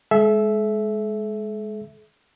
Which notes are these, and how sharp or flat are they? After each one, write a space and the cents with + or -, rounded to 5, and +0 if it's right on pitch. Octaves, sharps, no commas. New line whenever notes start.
G#3 +0 A4 -45 E5 +0